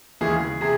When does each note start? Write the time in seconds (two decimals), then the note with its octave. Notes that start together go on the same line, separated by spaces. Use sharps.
0.21 D#2 C#3 E3 G#3 G#4
0.61 C3 G#4